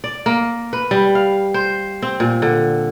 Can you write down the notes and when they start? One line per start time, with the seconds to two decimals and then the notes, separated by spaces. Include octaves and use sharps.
0.04 D5
0.26 A#3
0.73 B4
0.91 G3
1.15 F5
1.54 C5
2.02 C4
2.20 A#2
2.42 D3